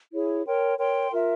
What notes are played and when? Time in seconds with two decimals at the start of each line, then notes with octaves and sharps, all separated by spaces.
0.12 E4 G#4 C#5
0.46 A#4 C#5 G5 C6
0.78 A#4 C#5 G5 C6
1.12 F4 A#4 E5